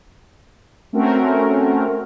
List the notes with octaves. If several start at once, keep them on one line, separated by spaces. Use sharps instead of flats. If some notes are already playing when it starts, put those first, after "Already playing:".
A3 C4 C#4 F#4 A#4